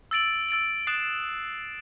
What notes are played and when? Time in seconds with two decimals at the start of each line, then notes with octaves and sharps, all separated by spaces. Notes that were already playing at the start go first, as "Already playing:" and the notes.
0.11 E6 A6 D7 F#7
0.49 E6 A6 D7 F#7
0.87 D#6 F#6 A6 C7 E7